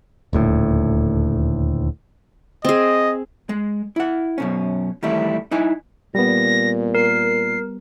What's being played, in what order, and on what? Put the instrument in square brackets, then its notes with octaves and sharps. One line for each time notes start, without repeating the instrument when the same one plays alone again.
[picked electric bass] D#1 D2 A2
[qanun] C4 G#4 [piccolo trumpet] D#5
[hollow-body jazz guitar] G#3
E4 F#5
F#2 B2 C#4
D#3 E3 G3 A3 E4
D#4 E4 G#5
[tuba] A#2 [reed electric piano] G3 B3 [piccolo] A#6
[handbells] A#4 [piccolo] C7